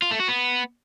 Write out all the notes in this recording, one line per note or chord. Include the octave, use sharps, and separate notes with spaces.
F4
A3
F#4
B3